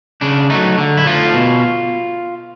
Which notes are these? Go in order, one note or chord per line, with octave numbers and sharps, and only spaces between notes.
C#3 D4
F#3 A3 D#4
D3
E4
F3 A3 F4
B2